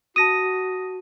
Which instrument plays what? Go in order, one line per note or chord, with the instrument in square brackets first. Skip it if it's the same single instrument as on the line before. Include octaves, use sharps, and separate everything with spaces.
[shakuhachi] F#4 [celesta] A5 D#7 [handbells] D#6 A#6